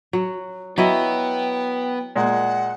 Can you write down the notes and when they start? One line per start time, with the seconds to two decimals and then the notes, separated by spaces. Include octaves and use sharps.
0.13 F#3
0.78 F#3 B3 E4 D#5 G5
2.16 A#2 G#3 F#5